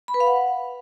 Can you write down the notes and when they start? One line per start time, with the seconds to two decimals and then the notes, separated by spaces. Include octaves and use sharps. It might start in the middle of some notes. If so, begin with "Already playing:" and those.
0.08 B5
0.14 B4
0.20 F5
0.26 F#5